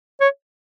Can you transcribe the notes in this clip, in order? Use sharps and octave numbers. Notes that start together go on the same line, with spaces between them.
C#5